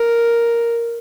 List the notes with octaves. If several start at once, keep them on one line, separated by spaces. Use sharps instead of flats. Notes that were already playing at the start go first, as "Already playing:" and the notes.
Already playing: A#4